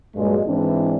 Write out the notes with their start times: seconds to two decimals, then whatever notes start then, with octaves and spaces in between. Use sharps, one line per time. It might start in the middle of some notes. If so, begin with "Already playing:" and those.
0.16 G2 A#2 F#3 G#3
0.47 G#2 E3 C4 D4 E4